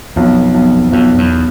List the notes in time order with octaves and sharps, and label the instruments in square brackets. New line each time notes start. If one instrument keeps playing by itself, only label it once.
[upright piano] B1 [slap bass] F2
[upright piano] B1
[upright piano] B1 [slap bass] F2
[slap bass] E2